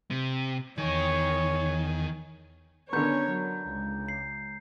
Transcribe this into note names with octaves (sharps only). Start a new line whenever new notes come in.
C3
E2 D#3 C#5 G#5
D3 B3 C#4 A#4 C#5 A#5 G6
F#3
C#2
C7